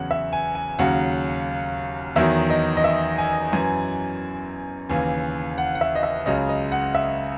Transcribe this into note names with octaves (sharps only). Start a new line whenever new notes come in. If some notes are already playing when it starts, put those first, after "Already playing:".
Already playing: E2 C#3 F#3 F#5
E5
G#5
G#5
D#2 C#3 F#3 F#5
E2 D#3 F#3 E5
D#5
D#5
E5
G#5
F#2 E3 G#5
D#2 C#3 E3 G#5
F#5
F#5
E5
D#5
E5
C#2 C#3 F#3 D#5
D#5
F#5
E5